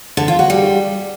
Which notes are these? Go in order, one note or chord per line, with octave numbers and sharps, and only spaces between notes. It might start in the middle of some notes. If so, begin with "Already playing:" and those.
D3
F4
F#4
G3